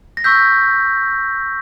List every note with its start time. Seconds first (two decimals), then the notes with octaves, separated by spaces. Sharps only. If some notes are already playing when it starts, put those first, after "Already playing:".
0.17 A#6
0.24 C#6 E6 G6 B6